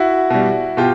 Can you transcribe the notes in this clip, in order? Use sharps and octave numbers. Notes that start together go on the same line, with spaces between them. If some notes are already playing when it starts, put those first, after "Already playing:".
Already playing: E4 F#4
B2 G3
B2 F4 G4